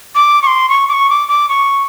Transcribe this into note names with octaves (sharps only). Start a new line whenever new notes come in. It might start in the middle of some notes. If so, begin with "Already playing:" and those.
D6
C#6
C6
C#6
D6
C#6
D6
D6
C#6